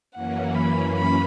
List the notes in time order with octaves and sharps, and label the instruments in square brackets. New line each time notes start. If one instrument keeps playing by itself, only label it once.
[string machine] F#2 E3 A#3 C#4 [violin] F#5
[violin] B5
B5